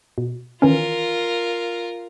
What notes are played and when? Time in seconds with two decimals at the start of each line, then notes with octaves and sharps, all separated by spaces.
0.18 B2
0.62 D#3 E3 C#4 F4 A#4